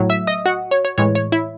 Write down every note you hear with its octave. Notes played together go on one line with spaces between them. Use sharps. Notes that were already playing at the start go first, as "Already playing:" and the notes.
Already playing: A2 F#3
E5 E6
D#5 D#6
F#4 F#5
C#5
C#5
A2 E3 G#3 C#5
C#5
E4 E5